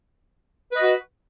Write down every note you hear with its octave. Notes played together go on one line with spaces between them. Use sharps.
F#4 B4 D#5